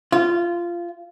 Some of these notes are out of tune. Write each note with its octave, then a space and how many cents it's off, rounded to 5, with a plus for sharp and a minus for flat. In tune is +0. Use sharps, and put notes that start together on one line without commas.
F4 -15